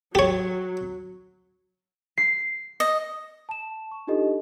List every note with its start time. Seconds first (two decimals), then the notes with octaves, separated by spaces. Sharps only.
0.15 F#3 G4 C#5
2.18 C7
2.80 D#5
3.49 A5 E7
3.91 C#6
4.07 D4 D#4 F4 G4 A4 D#5